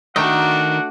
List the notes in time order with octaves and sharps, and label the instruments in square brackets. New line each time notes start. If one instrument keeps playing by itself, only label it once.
[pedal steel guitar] D#3 A#4 D#5 [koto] A3 G5 [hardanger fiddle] D4 F#4 [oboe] F#5